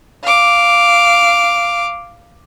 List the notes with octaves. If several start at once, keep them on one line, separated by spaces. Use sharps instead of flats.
F5 D6